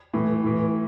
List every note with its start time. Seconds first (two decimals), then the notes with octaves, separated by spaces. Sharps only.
0.13 A2 E3
0.44 A2 E3